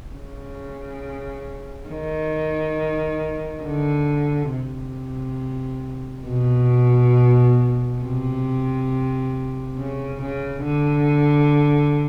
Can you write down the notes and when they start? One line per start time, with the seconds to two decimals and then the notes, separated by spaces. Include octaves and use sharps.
0.13 C#3
1.89 D#3
3.64 D3
4.52 C3
6.27 B2
8.02 C3
9.77 C#3
10.21 C#3
10.64 D3